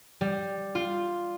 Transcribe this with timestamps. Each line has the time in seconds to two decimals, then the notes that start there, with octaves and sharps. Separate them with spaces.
0.21 G3
0.75 F4